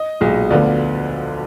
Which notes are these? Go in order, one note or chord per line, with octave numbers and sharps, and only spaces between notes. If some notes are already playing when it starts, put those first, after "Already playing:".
Already playing: D#5
B1 A#2 G#3
D2 D3 F3 B3 F4 D5